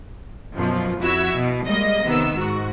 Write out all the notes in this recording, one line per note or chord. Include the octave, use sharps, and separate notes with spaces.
F#2 B2 F3
F2 E4 F#4 E6 G#6
B2
G3 G#3 A#3 D#5
C3 D#3 B3 E6
G#2 F#4